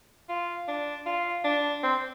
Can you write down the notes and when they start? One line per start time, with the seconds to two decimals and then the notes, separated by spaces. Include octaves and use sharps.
0.29 F4
0.68 D4
1.06 F4
1.44 D4
1.83 C4